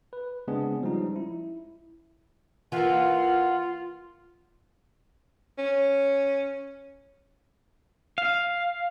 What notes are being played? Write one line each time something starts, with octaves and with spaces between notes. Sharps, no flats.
B4
C#3 G#3 B3 C4 D4 G#4
F3 G3 G#3 C#4 D#4
E4
E3 A#3 F4 F#5
C#4
F5